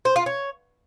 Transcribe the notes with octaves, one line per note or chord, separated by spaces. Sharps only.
C5
F4
C#5